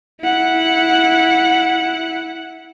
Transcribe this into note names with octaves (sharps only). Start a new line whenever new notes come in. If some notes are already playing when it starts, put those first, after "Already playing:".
E4 F#5